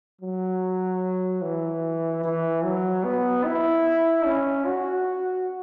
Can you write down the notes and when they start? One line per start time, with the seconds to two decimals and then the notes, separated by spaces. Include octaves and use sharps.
0.22 F#3
1.42 E3
2.24 E3
2.65 F#3
3.04 B3
3.45 E4
4.25 C#4
4.66 F#4